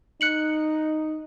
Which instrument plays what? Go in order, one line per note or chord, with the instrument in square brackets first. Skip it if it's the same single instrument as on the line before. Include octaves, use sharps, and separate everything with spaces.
[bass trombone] D#4 [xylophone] F#6 C#7 F#7